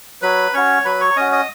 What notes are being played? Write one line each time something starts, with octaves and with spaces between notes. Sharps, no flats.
F#3 B4 B5
C#4 F#4 C#5 C#6
F#3 B4 B5
C#5 C#6
C#4 F#4 D#5 D#6
D#5 D#6